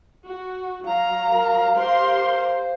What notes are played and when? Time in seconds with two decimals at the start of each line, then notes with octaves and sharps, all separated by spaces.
0.24 F#4
0.86 F#3 F5 A#5
1.30 A#4
1.77 G4 A#4 C5 C6